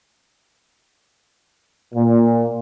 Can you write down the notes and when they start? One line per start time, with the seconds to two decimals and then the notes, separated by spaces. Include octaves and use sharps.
1.94 A#2